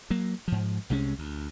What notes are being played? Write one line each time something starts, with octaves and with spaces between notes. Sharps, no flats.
F#3 A#3
G#2 F3
C2 C3 G#3 C#4
D2